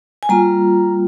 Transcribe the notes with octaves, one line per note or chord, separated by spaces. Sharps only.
G#5
G3 A#3 F4 A#5